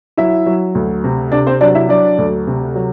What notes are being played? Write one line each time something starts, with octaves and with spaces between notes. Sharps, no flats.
F#3 E4 E5
F#3
D2
C3
C3 D4 D5
C4 C5
F#3 D4 D5
E4 E5
F#3 D4 D5
D2
C3
F#3